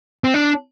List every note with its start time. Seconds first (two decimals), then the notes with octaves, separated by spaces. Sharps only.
0.24 C4
0.34 D4